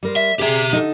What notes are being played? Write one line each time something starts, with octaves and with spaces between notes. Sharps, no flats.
G3 A#4 C5
E5
C3 G4 G#4 E5
D3 D#4 A4